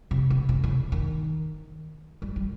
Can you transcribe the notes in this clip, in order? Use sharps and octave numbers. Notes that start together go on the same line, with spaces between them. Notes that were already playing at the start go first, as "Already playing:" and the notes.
C3
C3
C3
C#3
D#3
G3
G3